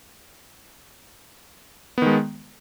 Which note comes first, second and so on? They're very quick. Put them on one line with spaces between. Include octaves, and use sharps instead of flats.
B3 D#3 G#3